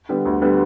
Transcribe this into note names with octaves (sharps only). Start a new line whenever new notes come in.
D3 G3 B3
D2
D3 G3 B3